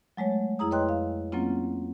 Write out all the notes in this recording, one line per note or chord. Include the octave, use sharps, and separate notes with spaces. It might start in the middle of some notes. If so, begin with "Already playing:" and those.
F#3 G#3 A3 C#5
F2 E4 G#4 A#5 D#6
B4 C#5 D#5 G5 C6 F#6
F5
F#3 A#3 C4 C#4 F4